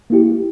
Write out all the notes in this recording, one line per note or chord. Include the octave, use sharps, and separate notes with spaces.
A#3 E4 G4